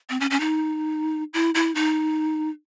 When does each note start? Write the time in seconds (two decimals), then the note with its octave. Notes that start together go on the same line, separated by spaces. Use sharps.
0.10 C4
0.20 C#4
0.31 C#4
0.40 D#4
1.34 E4
1.55 E4
1.75 D#4